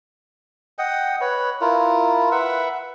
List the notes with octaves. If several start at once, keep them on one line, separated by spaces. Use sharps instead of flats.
D#5 F#5 G5
B4 C#5
E4 F4 A#4
B4 E5 F#5